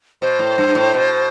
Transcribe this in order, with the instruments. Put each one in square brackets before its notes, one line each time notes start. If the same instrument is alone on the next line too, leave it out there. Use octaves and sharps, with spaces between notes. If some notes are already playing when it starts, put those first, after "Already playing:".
[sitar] B2 [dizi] C5
[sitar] A2
G2
A2
B2